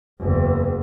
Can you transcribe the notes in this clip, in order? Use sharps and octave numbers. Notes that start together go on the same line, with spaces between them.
F#1 E2